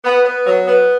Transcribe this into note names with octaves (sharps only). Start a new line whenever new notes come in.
B3
B3
F#3
B3